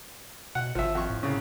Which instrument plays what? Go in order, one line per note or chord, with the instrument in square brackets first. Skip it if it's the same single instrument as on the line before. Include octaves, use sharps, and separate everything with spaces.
[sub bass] B2 [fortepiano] F#5
[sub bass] G#1 [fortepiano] F3 E5
[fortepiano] F2 C#6
[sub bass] A2
[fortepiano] C2 C#3